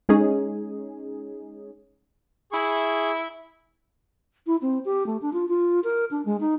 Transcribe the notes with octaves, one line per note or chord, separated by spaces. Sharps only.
G#3 C#4 D#4 G#4
E4 G#4 C#6
E4
C4
G4
A3
D4
F4
F4
A#4
D4
G#3
D#4